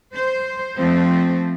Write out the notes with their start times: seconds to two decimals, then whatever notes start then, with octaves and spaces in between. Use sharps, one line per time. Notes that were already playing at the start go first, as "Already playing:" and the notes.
0.14 C5
0.77 F3 A3 C4